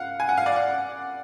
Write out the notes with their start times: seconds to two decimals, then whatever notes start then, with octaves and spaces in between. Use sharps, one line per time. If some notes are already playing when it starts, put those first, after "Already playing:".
Already playing: F5 F#5
0.20 G#5
0.29 F#5
0.37 F5
0.46 D5
0.56 F#5